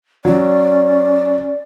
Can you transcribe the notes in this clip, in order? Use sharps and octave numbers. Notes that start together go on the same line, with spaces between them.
F#3 C#4 D5